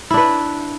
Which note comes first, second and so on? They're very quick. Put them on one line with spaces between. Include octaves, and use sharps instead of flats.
E4 D4 B4